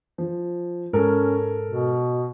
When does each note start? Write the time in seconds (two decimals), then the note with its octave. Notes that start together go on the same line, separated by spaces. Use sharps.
0.18 F3
0.93 G#2 C#4 A4 A#4
1.67 B2